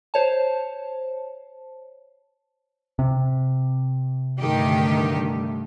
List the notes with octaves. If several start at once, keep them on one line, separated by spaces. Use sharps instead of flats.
C5 C#5 A5
C3
G2 D3 D#3 A3 G4